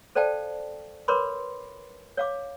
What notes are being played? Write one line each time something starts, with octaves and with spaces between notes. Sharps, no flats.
A4 C5 D5 F5 G5 A5
A#4 B4 C#5 B5 C6 D6
C#5 F5 D6